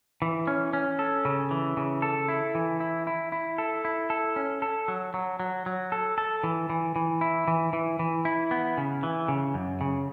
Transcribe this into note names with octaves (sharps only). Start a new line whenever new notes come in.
E3
C#4
C#4
A4
C#3
E3
C#3
A4
E4
E3
E4
E4
E4
A4
E4
A4
C#4
A4
F#3
F#3
F#3
F#3
A4
A4
E3
E3
E3
E4
E3
E3
E3
E4
B3
C#3
E3
C#3
F#2
C#3